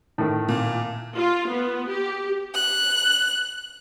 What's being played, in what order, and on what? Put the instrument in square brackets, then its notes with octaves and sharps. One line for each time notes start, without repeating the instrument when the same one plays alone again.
[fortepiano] A2 D#3
[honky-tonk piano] A#2
[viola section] F4
B3
G4
[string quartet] F#6